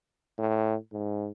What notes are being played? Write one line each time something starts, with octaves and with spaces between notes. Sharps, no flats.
A2
G#2